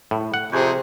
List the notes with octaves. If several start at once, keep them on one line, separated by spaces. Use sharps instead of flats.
A2
F#5
F2 C3 G#4